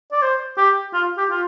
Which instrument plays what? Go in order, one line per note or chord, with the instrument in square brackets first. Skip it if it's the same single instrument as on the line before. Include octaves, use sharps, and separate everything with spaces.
[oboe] D5
C5
G4
F4
G4
F4